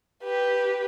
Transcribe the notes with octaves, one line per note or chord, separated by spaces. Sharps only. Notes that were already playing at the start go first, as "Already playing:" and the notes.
G4 B4